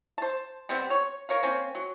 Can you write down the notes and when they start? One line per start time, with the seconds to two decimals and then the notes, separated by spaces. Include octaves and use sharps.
0.18 C5 A5
0.69 C3 G3 B3 C4
0.90 C#5
1.29 A#4 C#5 F5
1.43 A#3 C4 C#4
1.75 F#3